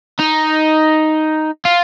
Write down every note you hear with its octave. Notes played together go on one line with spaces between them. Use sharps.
D#4
F4